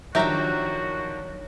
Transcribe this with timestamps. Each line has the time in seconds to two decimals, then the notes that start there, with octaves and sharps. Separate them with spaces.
0.15 D#3 F3 F#3 D4 F#4 G4 E5 A#5